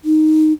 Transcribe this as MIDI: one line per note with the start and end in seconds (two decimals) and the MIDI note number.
0.05 0.53 63